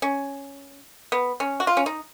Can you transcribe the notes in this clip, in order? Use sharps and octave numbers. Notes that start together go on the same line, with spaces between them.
C#4
B3
C#4
F#4
F4
C#4
D#4